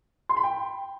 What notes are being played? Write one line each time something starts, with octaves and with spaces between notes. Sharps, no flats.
C6
B5
G5